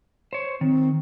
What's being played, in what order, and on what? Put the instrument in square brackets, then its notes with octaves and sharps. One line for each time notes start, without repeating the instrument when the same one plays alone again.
[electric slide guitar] C5 C#5
[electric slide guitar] D#3 [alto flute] C4